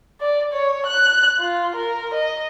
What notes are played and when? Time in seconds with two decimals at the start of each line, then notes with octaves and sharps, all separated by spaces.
0.21 D5
0.53 C#5
0.86 F#6
1.40 F4
1.75 A#4
2.14 D#5